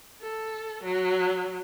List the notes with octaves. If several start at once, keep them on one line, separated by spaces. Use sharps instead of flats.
A4
F#3